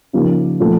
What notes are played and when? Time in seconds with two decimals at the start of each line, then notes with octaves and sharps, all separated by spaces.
0.13 C#3 F3 A#3 D#4 G4
0.60 A#2 F3 A3